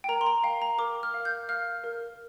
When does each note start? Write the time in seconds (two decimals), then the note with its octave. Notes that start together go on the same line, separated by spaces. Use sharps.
0.04 G5
0.09 A#4 A#5
0.21 C6
0.26 A#5
0.44 F5 G5
0.62 A#5
0.78 A#4 D6
1.03 F6
1.14 F5
1.25 G6
1.49 F5 F6
1.84 A#4